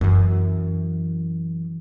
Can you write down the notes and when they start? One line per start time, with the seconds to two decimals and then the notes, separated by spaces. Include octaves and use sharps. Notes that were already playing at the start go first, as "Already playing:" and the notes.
0.01 F#2 E3